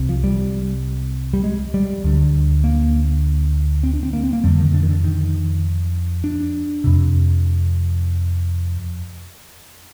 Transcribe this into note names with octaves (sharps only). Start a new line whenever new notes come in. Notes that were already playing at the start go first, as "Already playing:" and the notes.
Already playing: C2 C3
F3
G3
G3
G#3
G3
D2 D3
A#3
C4
D4
C4
A#3
C4
A#3
F2 D3 G3
D#3
D3
D#3
D3
D#3
D4
F2 C3